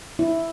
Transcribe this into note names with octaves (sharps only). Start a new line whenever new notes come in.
E4